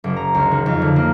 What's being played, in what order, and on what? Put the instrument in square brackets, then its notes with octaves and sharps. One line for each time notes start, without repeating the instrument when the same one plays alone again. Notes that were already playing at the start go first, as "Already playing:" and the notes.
[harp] F#1
A#5
C#2
D#3
F2
D3
A#3